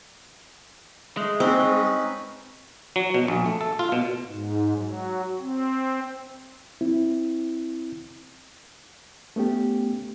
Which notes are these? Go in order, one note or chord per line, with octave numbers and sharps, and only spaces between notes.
G#3 A3
C4 C#4 D#4 B4
F#3
B2
A#1
A3
A4
F4
B2
G#2
F#3
C4
C4 E4
A3 B3 C#4 G4